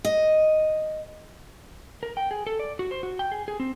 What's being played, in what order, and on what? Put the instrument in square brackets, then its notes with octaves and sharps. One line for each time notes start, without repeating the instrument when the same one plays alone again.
[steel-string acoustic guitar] D#5
[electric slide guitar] A#4
G5
G#4
A4
D5
F#4
C5
F#4
G5
G#4
G#4
C4